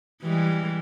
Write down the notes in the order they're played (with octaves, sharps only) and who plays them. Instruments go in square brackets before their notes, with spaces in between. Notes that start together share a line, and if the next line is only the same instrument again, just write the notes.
[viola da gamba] E3 G3 G#3